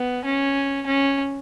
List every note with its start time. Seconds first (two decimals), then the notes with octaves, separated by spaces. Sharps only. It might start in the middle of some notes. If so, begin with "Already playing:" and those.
Already playing: B3
0.25 C#4
0.87 C#4